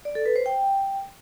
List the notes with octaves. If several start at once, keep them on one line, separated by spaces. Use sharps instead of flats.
D5
A4
B4
C5
G5